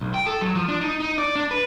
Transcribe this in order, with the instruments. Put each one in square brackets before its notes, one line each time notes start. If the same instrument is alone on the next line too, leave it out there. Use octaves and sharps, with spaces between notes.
[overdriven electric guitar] B1
G5
A4
F#3
F3
D4
D#4
D#4
D5
D4
B4